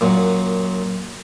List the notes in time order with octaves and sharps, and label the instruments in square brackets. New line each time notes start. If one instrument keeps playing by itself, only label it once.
[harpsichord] F#2 A#2